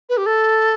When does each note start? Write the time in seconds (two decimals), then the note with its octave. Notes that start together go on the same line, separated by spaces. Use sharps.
0.09 B4
0.17 G4
0.26 A4